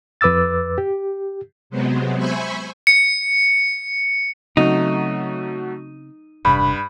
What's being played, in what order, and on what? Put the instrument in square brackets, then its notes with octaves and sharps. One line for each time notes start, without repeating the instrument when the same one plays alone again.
[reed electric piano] F2 B4 D6 E6 A6
G4
[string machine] C3 F#3 G#3 B3 C4
C5 E5 G#5 B5 C#6
[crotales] C#7
[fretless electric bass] C#3 C4 C#4 [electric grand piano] F#3 A3 F#4 [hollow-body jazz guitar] D#4
[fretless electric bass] E1 C3 D4 [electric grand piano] G2 [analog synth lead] B5